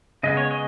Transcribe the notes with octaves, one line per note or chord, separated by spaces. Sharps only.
C#3 G#3 B3 D#5
C#5
D#5